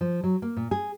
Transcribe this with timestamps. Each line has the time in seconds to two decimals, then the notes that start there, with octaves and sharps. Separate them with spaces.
0.01 F3
0.24 F#3
0.42 A#3
0.57 A#2
0.71 G#4